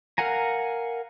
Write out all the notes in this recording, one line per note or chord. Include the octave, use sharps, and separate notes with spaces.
A#4 F5 F#5 G#5 A#5